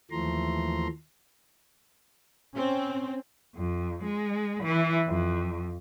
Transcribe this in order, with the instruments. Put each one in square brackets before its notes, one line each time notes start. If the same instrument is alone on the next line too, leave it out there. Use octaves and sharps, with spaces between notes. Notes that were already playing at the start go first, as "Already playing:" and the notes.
[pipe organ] D#2 E3 F3 A3 A#5 C6
[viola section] C4 [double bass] C#4
[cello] F2
G#3
E3
F2